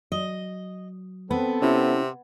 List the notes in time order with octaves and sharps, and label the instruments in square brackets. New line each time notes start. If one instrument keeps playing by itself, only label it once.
[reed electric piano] F#3 [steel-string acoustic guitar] D#5
[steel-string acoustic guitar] B3 [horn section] C4 A4 [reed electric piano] B4
[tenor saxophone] C3 [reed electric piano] C#4 E4